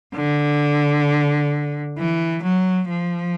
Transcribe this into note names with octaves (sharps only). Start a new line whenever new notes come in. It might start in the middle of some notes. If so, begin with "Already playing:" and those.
D3
E3
F#3
F3